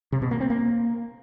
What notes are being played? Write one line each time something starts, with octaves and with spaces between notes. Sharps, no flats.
C3
B2
A#3
C4
A#3